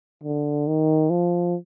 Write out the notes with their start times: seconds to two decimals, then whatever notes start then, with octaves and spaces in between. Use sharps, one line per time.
0.24 D3
0.67 D#3
1.10 F3